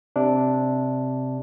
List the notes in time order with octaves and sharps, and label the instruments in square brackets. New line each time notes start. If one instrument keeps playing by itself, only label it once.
[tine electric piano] C3 D4